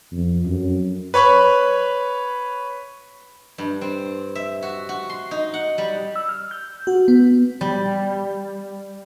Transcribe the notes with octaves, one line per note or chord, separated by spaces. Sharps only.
F2
F#2
B4 C#5 B5 C#6
G2
C4
E5
F#4
F#4
C6
D#4
F#5
G3
E6
F6
G6
F#4
B3
G3